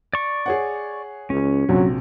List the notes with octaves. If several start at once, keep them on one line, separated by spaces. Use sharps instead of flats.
D5 C#6
G#4 C#5 F#5
C#2 C#4
A#1 C3 F#3 F#4